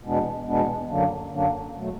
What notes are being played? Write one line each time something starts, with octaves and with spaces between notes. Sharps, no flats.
E2 B2 G#3 B3 D4
E2 B2 G#3 B3 D4
F#2 D3 F#3 A#3 D4
F#2 D3 F#3 A#3 D4
E2 B2 F#3 A3